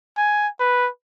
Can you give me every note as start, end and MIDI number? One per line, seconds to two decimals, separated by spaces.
0.17 0.48 80
0.60 0.89 71